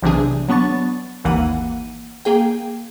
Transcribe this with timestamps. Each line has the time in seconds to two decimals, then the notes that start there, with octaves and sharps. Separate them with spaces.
0.02 B1 C3 E3 D4 G#4
0.48 F#3 B3 D4 C#6 A6
1.24 G#1 D#2 E3 A#3 F#5 D#7
2.25 A#3 G#4 G5